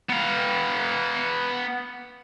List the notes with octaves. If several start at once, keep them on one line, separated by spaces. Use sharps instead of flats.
B3 F5